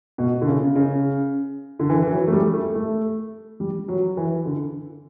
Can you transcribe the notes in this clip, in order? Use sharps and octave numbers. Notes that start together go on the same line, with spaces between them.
B2
D3
C#3
C#3
D3
E3
E3
F#3
A3
G3
A3
A3
G3
F#3
E3
D3